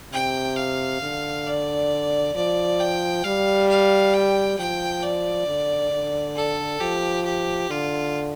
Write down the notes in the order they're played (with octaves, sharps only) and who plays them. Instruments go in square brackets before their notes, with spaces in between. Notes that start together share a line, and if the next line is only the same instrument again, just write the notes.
[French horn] C3 [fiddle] G5
[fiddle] F5
[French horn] D3
[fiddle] D5
[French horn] F3 [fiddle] D5
[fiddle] G5
[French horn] G3 [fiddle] F5
[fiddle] F5
G5
[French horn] F3 [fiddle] G5
[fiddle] D5
[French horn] D3
D3
[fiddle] A4
[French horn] F3 [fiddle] G4
[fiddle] G4
[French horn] D3 [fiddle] F4